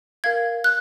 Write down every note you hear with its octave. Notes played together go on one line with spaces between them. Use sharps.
A#4 F5 G#6
F#6